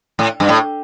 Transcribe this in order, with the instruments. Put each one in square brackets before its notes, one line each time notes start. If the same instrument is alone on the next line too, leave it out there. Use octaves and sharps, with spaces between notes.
[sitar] A2
G2
A2